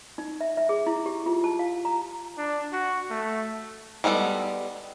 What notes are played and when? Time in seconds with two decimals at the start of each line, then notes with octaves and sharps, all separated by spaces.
0.18 D#4
0.41 E5
0.57 E5
0.69 G#4
0.86 E4
1.06 G4
1.26 F4
1.44 A5
1.59 F5
1.85 A#5
2.38 D4
2.73 F#4
3.10 A3
4.04 G3 G#3 B3 F4 A4